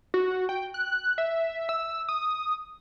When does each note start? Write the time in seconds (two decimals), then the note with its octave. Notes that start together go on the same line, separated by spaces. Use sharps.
0.14 F#4
0.49 G5
0.74 F#6
1.18 E5
1.69 E6
2.08 D#6